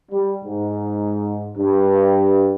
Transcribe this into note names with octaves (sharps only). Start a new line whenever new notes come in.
G3
G#2
G2